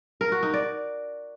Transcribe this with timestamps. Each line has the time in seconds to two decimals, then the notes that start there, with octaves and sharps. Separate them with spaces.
0.21 A#4
0.32 F#4
0.43 D#4
0.54 D5